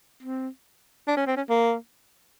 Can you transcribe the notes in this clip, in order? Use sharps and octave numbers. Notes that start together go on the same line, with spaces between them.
C4
D4
C#4
C4
C#4
A#3